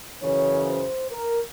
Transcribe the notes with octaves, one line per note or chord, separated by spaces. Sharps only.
F#2 C#3 E3 C#5
C5
A#4